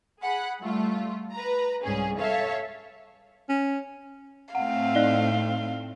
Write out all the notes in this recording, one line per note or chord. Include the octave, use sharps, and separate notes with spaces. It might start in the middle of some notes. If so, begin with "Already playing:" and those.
G#4 F#5 B5
G3 A3 F4
B4 A#5
C2 G#2 C#4 G#4
A4 C#5 E5 F5
C#4
A2 A3 C4 F5 F#5
D#4 D5 D#5 F#6 G7